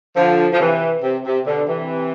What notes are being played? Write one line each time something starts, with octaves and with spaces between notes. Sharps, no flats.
D3 F3
F3
C3 E3
C3
C3
B2 D3
C3 E3